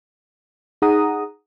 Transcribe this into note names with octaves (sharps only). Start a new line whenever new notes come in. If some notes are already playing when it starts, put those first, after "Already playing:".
D#4 G#4 F#5 A#5 D#6